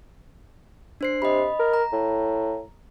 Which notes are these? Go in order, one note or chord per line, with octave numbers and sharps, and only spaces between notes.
D4 C5 C7
C3 D#5 B5
A#4
A#5
A2